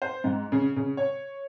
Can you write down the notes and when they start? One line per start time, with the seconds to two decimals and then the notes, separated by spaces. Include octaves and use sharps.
0.02 C5
0.24 G#2
0.52 C#3
0.76 C#3
0.97 C#5